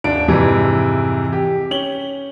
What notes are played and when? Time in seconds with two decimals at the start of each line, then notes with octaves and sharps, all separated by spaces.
0.04 D#1 D4 D7
0.28 F2 G#2 C3 E3
1.33 G4
1.71 C#4 F#7 G7